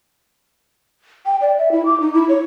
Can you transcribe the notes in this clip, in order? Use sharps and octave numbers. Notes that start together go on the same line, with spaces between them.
G5
D5
E5
E4
D6
D#4
E4
C#5